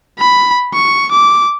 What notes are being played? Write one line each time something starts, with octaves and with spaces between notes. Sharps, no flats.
B5
C#6
D6